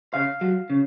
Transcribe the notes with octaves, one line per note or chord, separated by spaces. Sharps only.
C#3 F5
F#3
C#3